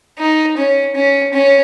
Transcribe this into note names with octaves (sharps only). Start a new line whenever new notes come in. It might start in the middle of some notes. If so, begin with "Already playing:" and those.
D#4
C#4
C#4
C#4